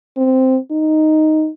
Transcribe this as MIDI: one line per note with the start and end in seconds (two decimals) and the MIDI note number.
0.17 0.58 60
0.71 1.50 63